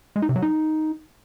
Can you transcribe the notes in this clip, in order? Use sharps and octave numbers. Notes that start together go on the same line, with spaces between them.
G#3
D#4
C3
F#3
D#4